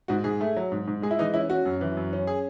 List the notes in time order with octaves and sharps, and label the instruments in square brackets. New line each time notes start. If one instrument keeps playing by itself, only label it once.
[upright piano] G#2 [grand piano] F#4
[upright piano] G#2 [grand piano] G#4
[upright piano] A3
F#3
G#2
G#2
[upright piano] G#3 [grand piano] G#4
[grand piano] E4
[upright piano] E3 [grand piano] D#4
[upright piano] C#4 [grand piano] E4
[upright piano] C#4 [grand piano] F#4
[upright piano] F#2
E3
F#2
C#4
[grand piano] G#4